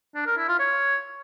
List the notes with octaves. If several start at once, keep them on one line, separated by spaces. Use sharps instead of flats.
D4
A#4
E4
F4
C#5